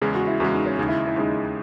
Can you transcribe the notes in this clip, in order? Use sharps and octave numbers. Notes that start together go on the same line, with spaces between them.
E2 C#3 G#3 G#4
F#4
E4
E2 C#3 G#3 F#4
D#4
C#4
D#2 C#3 G#3 D#4
E4
E4
D#2 C#3 G#3 D#4